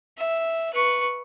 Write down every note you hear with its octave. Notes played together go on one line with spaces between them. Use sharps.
E5
B4 C#6